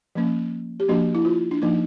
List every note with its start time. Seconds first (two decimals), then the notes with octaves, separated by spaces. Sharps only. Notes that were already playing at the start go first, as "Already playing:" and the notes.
0.15 F3 A#3 C#4
0.80 G4
0.89 F3 A#3 D4 F#4
1.15 E4
1.25 F4
1.51 D4
1.62 F3 A#3 D4 D#4